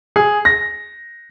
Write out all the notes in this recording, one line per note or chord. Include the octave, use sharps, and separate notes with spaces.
G#4
A#6